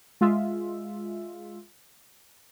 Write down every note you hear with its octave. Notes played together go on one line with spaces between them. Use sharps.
G#3 F4 E5